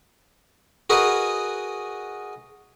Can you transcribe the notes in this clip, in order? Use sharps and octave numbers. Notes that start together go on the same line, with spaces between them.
F#4 G#4 A#4 B4 D#5